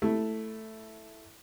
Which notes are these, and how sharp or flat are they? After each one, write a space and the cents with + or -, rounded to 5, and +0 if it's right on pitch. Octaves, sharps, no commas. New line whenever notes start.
A3 +0 E4 +0